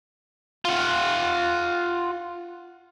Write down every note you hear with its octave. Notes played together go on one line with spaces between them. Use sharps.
F4 F#5